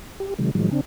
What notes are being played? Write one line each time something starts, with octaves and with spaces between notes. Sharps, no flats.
G4
C3 D#3 F#3 G#3
A2 D#3 F3 F#3 G#3
C#3 C4 D4